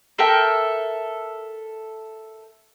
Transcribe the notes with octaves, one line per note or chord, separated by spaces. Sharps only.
A4 A#4 E5 G5